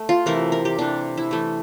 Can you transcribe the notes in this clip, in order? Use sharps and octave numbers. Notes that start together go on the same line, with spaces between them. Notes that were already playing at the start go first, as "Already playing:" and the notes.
Already playing: A3
F4
C3 E3 A3 A#4
A#4
G4
C3 E3 A3 D4
E4
E3 A3